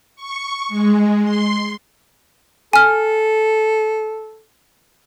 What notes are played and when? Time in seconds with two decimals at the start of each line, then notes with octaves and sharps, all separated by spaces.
0.16 C#6
0.68 G#3
1.22 C6
2.73 A4 G#5 F6